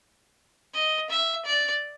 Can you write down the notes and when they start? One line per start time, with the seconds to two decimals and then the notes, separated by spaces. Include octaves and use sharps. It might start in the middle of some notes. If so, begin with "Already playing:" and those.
0.73 D#5
1.09 E5
1.45 D5